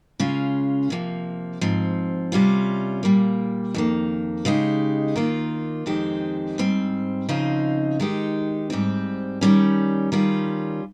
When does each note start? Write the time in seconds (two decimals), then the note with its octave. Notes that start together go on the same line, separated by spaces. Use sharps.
0.20 C#3 G#3 C#4 F4
0.90 C3 F3 A#3
1.61 G#2 F3 C4
2.32 C3 G3 C#4 F4
3.03 A#2 G3 A#3
3.74 F2 D#3 A#3
4.45 C#3 G#3 D#4 G4
5.16 D#3 A#3 F4
5.86 F2 D#3 G#3 C4 G4
6.58 G#2 G3 C4
7.29 C#3 F3 C4 D#4
8.00 D#3 G#3 D#4 G4
8.70 G#2 G3 C4
9.41 D#3 G3 C#4
10.12 D#3 G3 C#4 F4